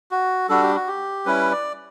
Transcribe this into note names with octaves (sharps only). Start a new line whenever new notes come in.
F#4
G3 D4 F#4 A4
G4
F#4
G4
G3 C#4 E4 B4
D5